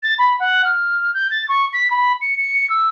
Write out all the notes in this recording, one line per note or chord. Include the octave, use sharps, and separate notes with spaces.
A6
B5
F#5
F6
G6
A6
C#6
B6
B5
C#7
C#7
E6